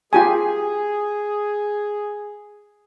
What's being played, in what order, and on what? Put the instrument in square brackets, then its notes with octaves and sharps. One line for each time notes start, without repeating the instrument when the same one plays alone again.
[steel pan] F4 G4 G#5 [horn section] G#4